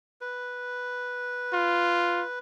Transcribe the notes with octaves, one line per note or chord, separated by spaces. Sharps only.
B4
F4